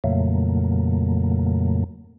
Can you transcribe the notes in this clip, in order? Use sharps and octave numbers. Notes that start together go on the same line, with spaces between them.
F2 A#2 C#3 F#3 A3 A#3